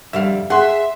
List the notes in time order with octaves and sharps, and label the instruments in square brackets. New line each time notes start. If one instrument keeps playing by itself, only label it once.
[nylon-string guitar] F2 D3 G3 [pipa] E5 F5
[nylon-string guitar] G#4 [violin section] E5 [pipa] F#5 C6